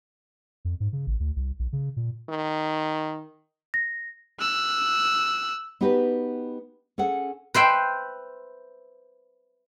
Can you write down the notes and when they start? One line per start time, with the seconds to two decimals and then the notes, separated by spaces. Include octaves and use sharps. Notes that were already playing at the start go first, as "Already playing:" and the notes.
0.65 F2
0.80 G#2
0.93 C#3
1.07 A1
1.20 D2
1.36 C2
1.59 B1
1.73 C#3
1.97 A#2
2.29 D#3
3.74 A#6
4.40 E6 F#6
5.81 B3 D#4 F#4 G4 B4
6.98 C#4 G#4 A4 F#5
7.54 B4 C5 E5 G5